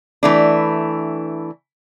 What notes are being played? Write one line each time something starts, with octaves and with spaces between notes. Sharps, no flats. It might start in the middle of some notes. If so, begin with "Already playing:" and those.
E3 A3 D4